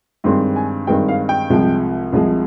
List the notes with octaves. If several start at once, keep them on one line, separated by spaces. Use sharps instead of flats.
G2 D#3 G#3 C4 C6
G#5
G2 D#3 G#3 C4 G5
F5
G5
C2 C3 F3 G#3
C2 C3 F3 G#3